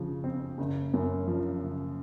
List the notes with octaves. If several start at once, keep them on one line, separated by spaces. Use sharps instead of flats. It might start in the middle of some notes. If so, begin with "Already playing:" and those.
Already playing: C#3 F3
C4
F#1
F#2
F3
F#1